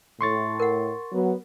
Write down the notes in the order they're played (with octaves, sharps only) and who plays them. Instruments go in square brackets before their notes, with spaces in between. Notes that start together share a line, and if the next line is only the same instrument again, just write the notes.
[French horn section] A2 [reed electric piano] C6 C#6 A6
[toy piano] A#4 F#5
[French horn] F#3 [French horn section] B3